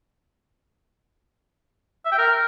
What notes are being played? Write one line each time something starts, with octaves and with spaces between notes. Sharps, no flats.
E5
G5
A#4